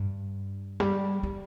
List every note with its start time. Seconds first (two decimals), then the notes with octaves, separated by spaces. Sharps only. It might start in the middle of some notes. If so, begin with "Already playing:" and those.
Already playing: G2
0.80 G3
1.23 G3